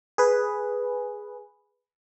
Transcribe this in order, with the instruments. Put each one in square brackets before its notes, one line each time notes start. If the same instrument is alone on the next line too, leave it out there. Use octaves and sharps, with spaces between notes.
[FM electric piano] G#4 B4